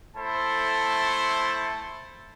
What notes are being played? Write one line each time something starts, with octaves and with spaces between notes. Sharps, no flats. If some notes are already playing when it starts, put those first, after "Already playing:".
A3 E4 A4 C5 A5